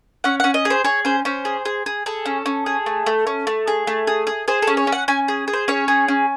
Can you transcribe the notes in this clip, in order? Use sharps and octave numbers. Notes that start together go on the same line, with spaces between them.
C#4 F#5
C#4 F#5
D#5
G#4
C5
G#4 C#5
C#4 C5
C#4 C5
G#4
G#4
G#4
G#4 A4
C#4
C#4
G#4
A3
A3
C#4
A3
G#4
A3
G#4
G#4
G#4 C5
A4
C#4
C#5
C#4
F#5
C#4 G#5
G#4
G#4
C5
C#4 C#5
G#4
C#4